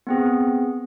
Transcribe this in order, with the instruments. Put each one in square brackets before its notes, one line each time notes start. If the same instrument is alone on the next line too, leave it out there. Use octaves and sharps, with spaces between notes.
[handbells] B3 C4 G#4